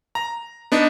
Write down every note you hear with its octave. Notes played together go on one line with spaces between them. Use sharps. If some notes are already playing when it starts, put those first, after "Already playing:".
A#5
B3 D4 D#4